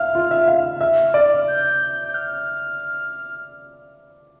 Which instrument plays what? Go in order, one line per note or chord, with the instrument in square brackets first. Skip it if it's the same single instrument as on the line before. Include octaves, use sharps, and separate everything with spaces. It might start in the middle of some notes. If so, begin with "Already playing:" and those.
Already playing: [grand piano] E5 F5 [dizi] F6
[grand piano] F4
E5
F5
[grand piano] E5 [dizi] F6
[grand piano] D5
[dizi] G6
G6
F6